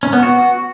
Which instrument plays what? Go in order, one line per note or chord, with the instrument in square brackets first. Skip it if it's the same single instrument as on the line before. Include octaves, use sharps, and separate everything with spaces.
[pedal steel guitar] C#4
B3
F#4